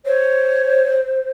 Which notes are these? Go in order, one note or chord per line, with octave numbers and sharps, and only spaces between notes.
C5 C#5